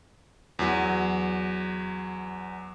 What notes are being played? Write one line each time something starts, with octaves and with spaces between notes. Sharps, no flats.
E2 F#3